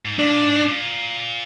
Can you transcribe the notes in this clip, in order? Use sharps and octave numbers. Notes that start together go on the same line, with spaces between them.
G#2
A#2 D4
G#2
G#2
A#2